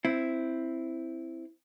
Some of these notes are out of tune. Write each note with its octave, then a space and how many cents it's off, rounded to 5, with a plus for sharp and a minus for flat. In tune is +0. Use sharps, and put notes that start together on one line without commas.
C4 +0 E4 +0